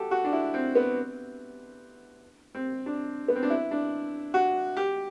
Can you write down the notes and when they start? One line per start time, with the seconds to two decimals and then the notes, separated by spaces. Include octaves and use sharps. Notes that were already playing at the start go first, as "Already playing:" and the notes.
Already playing: F#4 G4 A4
0.11 F#4
0.24 D4
0.33 E4
0.54 C4
0.75 B3
2.55 C4
2.86 D4
3.28 B3
3.36 C4
3.43 D4
3.50 E4
3.71 D4
4.34 F#4
4.77 G4